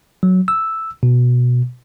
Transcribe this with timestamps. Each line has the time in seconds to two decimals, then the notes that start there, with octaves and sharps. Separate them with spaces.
0.23 F#3
0.48 E6
1.03 B2